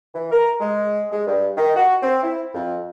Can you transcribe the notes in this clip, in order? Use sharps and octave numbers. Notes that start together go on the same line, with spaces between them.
E3
A#4
G#3
G#3
G2
D#3
F#4
C4
E4
F2